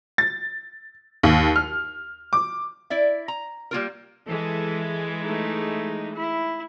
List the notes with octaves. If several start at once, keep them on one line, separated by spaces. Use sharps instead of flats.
A6
D#2
F6
D6
E4 D5 E5
A#5
G3 A#3 F4 A#4
E3 G#3 A4
A3 D#4
E4